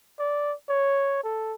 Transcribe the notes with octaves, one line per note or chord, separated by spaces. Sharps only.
D5
C#5
A4